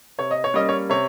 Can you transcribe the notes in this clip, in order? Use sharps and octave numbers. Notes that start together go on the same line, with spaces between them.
C3 C#5
D#5
C#5
G3 A#3 C#4 D#5
C#5
C3 C#5